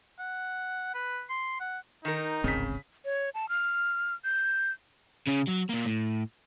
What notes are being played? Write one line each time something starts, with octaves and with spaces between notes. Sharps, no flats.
F#5
B4
C6
F#5
D#3 D#4 A#4
D1 G#1 C#3 C4 B6
C#5
A5
F6
G6
C#3 C#4
F#3
A#2 A#3
A2